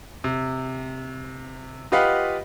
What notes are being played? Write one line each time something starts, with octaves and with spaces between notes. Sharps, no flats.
C3
F4 G4 B4 D#5 F5 F#5